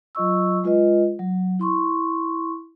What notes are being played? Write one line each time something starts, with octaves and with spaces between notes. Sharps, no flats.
F#3 F4 D#5 C#6 E6
G#3 F4 B4 D#5
F#3
E4 C6 C#6